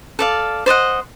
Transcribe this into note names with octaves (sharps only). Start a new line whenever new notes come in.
A4 D5 F5
C5 D5 D#5 F#5